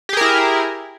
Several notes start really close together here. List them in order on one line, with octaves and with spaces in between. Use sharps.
G4 G#4 A#4 E4